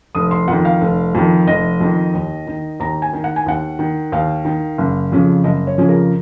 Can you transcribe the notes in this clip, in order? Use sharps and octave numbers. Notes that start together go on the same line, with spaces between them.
F1 D#6
C6
F2 D#3 F#5
F5
F1
F2 D#3
F1 D#5
F2 D#3
D#2
D#3
D#2 A#5
G#5
D#3
F#5
G#5
D#2 F#5
D#3
D#2 F5
D#3
F#1
F2 C#3 F3
F#1 D#5
C#5
F2 C#3 F3 G#4
A#4